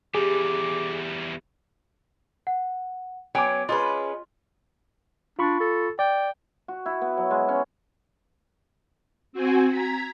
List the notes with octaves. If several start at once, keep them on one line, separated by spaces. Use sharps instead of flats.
E2 G3 G4 G#4 D6
F#5
F#3 B3 C#4 C#5 G5 G#5 D6 D7
G#3 C#4 F4 B4
D4 F4 B5 C#6
A4
D5 G5
F#4
E4
B3
F#3
G#3
C#4
C4 F#4 G#5
A#5 G#6 B6